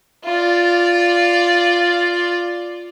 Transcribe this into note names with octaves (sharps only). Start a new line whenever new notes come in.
F4 D5